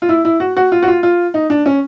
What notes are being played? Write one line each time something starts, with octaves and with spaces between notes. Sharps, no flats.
F4
E4
E4
F#4
F#4
F4
F#4
F4
F4
D#4
D4
C#4